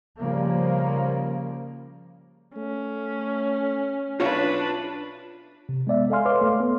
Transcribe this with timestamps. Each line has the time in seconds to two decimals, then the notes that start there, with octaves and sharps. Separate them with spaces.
0.19 C#3 F3 G3 A#3
2.56 A3 C#4
4.20 B1 D4 F4 B4 C#5 E5
5.69 C3
5.87 G#3 B3 D5 E5
6.10 A4 D#5 F5 G#5 C6 F6
6.26 B4 C#5 F5 C6 D6 F6
6.41 A3 A4
6.60 B3